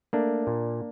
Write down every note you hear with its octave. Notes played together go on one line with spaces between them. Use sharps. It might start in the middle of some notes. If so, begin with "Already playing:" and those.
A3 A#3 D4
A#2